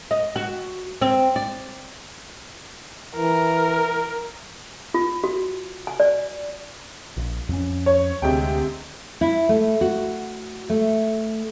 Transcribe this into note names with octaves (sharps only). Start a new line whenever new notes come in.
D#5
F#4
C4
D5
E3 A#4
F4
F#4
G#5
D5
A#1
F2 C#4
C#5
D2 C3 G#3 G5
E4
A3
F#4
A3